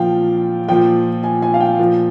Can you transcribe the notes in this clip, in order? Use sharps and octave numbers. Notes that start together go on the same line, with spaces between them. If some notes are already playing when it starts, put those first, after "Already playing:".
Already playing: A#2 F3 F5 G5
A#2 F3 G5
G#5
G#5
F5
G5
A#2 F3